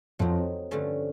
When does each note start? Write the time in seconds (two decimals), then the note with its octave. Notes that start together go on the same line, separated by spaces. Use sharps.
0.19 F2 F#3 A3 C4 D#4
0.71 G2 D3 F3 A3 C#4